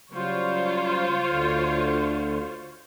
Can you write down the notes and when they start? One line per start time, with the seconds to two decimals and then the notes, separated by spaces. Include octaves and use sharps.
0.12 C#3 F#3 G3 F4 C5 C#5
1.27 D2 D3